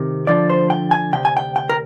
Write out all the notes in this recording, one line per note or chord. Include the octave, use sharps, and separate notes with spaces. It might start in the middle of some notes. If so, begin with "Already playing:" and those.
Already playing: C3 D#3
D2 D3 F3 D5
C5
G5
G#5
D2 C3 G5
G#5
G5
G5
A#4